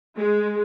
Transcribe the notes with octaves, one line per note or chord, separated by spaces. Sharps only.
G#3